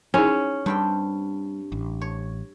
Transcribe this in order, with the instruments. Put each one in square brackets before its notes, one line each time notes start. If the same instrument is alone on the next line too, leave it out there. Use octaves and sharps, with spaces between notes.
[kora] C#4 [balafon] D#4 E4 G#4
[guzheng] G2 C4 G5 [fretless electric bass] G3
[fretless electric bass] A1
[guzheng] C#5